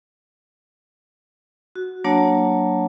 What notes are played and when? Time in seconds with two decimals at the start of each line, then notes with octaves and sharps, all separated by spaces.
1.76 F#4
2.04 F#3 A#3 D4 C#5 A5